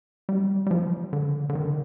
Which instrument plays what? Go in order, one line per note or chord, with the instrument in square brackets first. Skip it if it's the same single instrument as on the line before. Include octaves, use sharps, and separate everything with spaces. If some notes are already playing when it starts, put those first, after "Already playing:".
[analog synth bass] G3
G3
F3
D3
D3
D#3